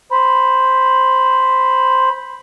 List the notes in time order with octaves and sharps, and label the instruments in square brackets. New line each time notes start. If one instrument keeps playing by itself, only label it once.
[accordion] C5 B5